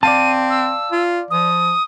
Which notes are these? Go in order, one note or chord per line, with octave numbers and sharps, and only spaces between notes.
C4 D5 F5 A5 D#7
E6
F4
F3 D#6